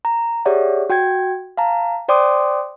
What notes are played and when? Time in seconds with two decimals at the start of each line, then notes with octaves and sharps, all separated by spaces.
0.05 A#5
0.45 G4 G#4 C#5 D5 E5 F#5
0.90 F#4 G5 G6 G#6
1.57 F5 A5 A#5
2.08 C5 D5 G5 C6 D6 D#6